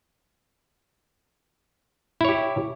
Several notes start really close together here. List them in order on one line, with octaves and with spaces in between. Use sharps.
E4 C#5 G4